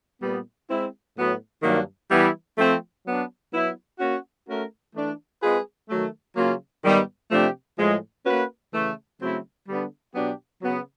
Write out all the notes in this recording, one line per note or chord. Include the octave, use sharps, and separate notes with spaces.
A#2 G3 B3
G#3 C4 E4
A2 F#3 B3
G2 D#3 F#3 A#3 D4
E3 G3 B3 E4
F3 A3 C4
F#3 B3 D4
F#3 B3 E4
A#3 C#4 F#4
A3 C#4 F#4 A#4
E3 A3 D4
G#3 C4 F4 G#4 B4
D#3 F#3 A3
C#3 F#3 A#3 C#4 F4
G#2 D#3 G3 B3 D#4
C3 F3 A3 D4 G4
A2 F3 G#3
A#3 C#4 F#4 B4
C#3 E3 A3
C#3 F#3 A3 C4 E4
D3 G3 B3 D4
B2 F#3 B3 D4 G4
C#3 F#3 B3